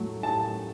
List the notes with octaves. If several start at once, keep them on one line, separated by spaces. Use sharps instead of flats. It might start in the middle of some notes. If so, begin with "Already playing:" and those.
Already playing: A2 F#3 A3
A2 A5